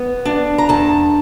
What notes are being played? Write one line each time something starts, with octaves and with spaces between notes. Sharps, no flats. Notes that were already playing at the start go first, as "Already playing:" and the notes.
Already playing: B3
D4
A#5
E2 A5